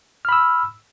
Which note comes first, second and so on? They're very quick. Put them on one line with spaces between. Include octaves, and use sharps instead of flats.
F6 B5 E6